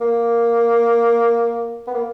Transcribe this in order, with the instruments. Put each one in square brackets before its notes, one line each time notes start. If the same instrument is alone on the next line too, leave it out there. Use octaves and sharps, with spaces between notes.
[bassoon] A#3
B3
A#3